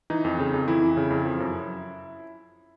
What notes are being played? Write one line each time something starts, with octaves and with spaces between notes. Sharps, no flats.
E3 D#4
F2
C#3
F2
E3 E4
F2
C#3
F2
F3
F#2